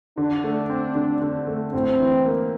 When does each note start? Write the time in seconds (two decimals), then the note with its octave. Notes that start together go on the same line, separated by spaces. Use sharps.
0.18 D3 D4
0.44 A3
0.70 C4
0.95 D3
1.22 D3
1.47 A3
1.74 A2 C4
2.00 E3
2.25 A#3